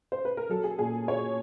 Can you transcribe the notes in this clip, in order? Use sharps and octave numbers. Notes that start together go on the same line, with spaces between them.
C5
B4
A#4
F#3 A4
G#4
A#2 G#4
A#2 C#5